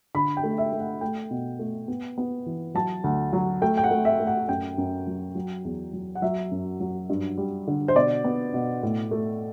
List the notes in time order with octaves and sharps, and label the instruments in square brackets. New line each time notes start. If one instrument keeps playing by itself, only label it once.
[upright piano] D3 B5
G5
A3
E5
A3
F#5
A3 G5
B2
A3
B3
B3
E3
F#3 A5
D2
F#3
A3 G5
G5
F#5
A3
E5
A3
F#5
F#2 G5
F#2
F#3
F#3
E2
F#3
F#5
F#3 E5
F#2
F#3
G2
G3
D3
C5
B2 D5
B3
B2
A2
A3